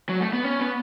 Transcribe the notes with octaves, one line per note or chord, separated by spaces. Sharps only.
F#3
A3
B3
C#4
B3